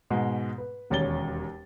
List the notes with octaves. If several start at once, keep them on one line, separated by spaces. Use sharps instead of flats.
G#2 B2 G#3
B4
E1 D#2 C#4 C#5 A6 G7